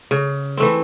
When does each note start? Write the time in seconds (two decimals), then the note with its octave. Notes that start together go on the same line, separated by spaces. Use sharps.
0.11 C#3
0.57 E3 A3 C4